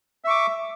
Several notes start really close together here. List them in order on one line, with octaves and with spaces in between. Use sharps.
E5 C#6 D6